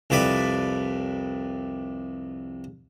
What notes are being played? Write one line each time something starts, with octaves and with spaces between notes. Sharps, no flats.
C2 F2 B4 D5 B5